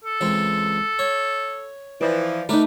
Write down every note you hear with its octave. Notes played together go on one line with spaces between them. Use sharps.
A4
C#2 E3 C4
C#5
E3 F3 D5
A3 D#4 A#4 B4 D5